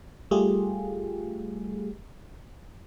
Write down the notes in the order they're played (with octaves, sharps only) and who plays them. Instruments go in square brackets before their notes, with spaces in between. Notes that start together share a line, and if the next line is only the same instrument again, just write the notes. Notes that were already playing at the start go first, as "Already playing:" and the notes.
[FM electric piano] G3 A3 F4 G4 G#4